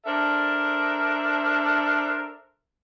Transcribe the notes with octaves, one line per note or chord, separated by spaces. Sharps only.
D4 A4 A#4 C5 E5